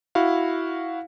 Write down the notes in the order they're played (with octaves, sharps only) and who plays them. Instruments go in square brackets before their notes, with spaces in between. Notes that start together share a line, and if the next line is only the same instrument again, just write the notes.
[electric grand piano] E4 F#4 F5